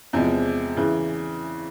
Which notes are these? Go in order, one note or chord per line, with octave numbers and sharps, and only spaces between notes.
E2 C3 F3 G#3
C#3 E3